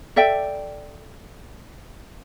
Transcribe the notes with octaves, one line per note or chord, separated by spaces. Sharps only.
A4 D5 E5 G5